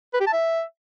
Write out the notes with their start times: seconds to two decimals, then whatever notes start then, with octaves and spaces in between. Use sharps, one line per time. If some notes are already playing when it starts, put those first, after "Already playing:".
0.14 B4
0.20 G4
0.27 A5
0.33 E5